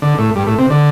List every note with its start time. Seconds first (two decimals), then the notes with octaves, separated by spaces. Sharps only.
0.02 D3
0.18 A2
0.36 G2
0.47 A2
0.58 C3
0.70 D3